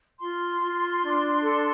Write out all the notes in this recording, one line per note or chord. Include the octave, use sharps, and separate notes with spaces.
F4 C6
F4
D4
A4